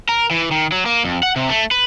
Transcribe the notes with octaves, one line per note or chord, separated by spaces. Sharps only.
A#4
E3
D#3
F#3
A#3
F2
F#5
C3
A3
B4